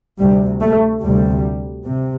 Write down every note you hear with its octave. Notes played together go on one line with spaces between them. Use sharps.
D2 C3 G3
A3
D2 C3 G3
C3